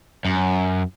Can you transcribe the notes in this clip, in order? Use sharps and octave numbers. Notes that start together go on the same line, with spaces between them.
F#2